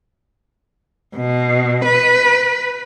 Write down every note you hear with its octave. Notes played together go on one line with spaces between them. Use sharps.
B2
B4